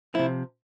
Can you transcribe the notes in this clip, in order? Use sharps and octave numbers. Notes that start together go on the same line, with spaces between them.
C3 F3 E4